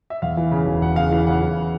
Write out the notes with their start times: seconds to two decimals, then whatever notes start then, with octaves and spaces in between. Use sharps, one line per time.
0.10 E5
0.22 E2 F5
0.37 E3
0.51 C#3
0.66 E1
0.81 E1 F#5
0.96 C#3 F5
1.11 E3 F5
1.27 C#3 F#5
1.42 E3